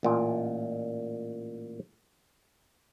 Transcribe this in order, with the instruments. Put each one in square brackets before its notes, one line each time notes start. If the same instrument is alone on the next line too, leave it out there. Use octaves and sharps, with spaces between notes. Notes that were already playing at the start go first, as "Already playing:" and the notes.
[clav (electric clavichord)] A1 A#2 F4